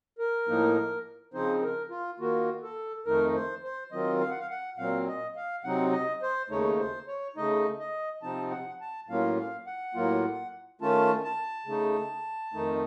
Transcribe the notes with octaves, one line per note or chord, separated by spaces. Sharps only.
A#4
A2 F3 A#3 D#4
C#3 F3 C4 D#4 C5
A#4
F4
D#3 A#3 F4 F#4
A4
F2 D#3 A3 D#4 A#4
C5
C5
D#3 F#3 C4 F4 D#5
F5
F#5
F5
F#5
A#2 F#3 C4 F5
D#5
F5
C3 F#3 C4 D#4 F#5
D#5
C5
D#2 C#3 A3 D#4 C#5
C5
C#5
C#3 A3 D#4 D#5
D#5
C3 F3 C4 D#4 A5
F#5
A5
A2 F#3 A#3 C#4 F4 F5
F5
F#5
A2 F#3 A#3 F4
D#3 A3 C#4 F4 A5
A5
C#3 A3 D#4
F2 D#3 A3 D#4